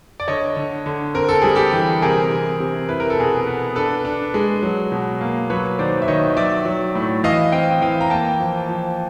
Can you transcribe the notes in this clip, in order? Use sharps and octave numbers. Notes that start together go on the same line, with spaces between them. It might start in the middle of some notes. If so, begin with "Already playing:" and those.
D5
D3 C#5 D#5
D3
D3
C4 A#4
A4
G3 G#4
G4 A4
E3
C3 G#4 A#4
C3
C3
E4 B4
A#4
A4
B2 G#4 A#4
B3
D4 A4 B4
D4
G#3
F#3
B2
A#3
F#3 B4 C#5
D#3 C5 D5
E5
D#3 C#5 D#5
F#3 D5 E5
F#3
A2
E3 D#5 F5
C4 F5 G5
E3 F5 G5
A#5
A#3 G5 A5
F3
F3